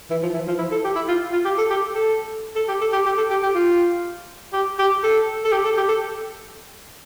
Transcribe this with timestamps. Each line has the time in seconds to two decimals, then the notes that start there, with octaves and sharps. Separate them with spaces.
0.10 E3
0.23 F3
0.34 E3
0.47 F3
0.59 E4
0.72 A4
0.84 G4
0.96 E4
1.08 F4
1.33 F4
1.45 G4
1.58 A4
1.70 G4
1.94 A4
2.56 A4
2.68 G4
2.81 A4
2.93 G4
3.06 G4
3.18 A4
3.30 G4
3.43 G4
3.55 F4
4.53 G4
4.79 G4
5.03 A4
5.45 A4
5.52 G4
5.65 A4
5.77 G4
5.89 A4